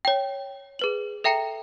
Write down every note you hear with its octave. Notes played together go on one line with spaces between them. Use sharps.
C#5 G5
G#4 B4 F#7
A4 E5 G5 A#5 C#7